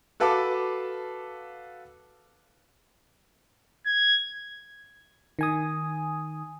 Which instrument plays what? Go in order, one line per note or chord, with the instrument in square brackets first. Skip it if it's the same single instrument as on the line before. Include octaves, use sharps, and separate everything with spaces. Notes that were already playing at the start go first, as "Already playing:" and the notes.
[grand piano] F#4 A4 B4 F5 A5 D6
[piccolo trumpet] G#6
[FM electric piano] D#3 G#5 D#6